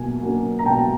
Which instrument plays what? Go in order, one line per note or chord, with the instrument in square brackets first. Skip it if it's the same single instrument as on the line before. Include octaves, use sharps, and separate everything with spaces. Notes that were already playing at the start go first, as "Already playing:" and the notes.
Already playing: [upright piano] B2 F#3 A#3 G#5
F#3 A#3 C#4
A#5
B2 G5 A5